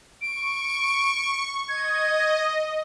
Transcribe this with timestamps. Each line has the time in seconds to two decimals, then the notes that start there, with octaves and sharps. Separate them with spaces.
0.21 C#6 D7
1.68 D#5 G#6